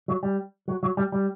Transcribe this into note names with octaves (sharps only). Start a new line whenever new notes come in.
F#3
G3
F#3
F#3
G3
G3